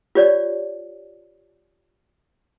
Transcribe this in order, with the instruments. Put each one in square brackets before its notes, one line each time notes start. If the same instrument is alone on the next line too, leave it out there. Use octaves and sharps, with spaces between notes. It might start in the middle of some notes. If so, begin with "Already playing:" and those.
[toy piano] F4 G4 C#5 D5